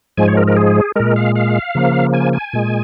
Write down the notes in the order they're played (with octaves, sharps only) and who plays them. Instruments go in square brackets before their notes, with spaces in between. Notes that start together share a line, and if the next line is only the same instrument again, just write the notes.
[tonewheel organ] G#2 F3 G#3 G#5
C#5
A#4
A#4
G#4
A#2 G#3 A#4
F5
F5
C#3 F3 A#3
G#5
G#5
A#2 G#3